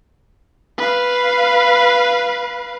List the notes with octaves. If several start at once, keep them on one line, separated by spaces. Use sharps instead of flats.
B4 F5